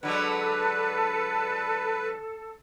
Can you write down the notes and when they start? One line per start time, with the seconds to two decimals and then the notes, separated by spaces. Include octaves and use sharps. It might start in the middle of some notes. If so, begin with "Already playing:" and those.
0.03 D3 F#3 G#3 A4 B4